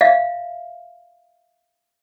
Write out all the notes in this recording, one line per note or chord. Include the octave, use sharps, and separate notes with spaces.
E5 F5